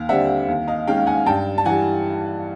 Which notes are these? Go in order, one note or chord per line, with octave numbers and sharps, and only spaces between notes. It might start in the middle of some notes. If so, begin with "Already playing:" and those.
Already playing: D#2 F5
D3 G3 C4 E5 F#5
D#2
D#5 F5
D#3 G#3 C#4 F5 G5
F#5 G#5
G2 G5 A5
A5
E3 G3 F#5 G#5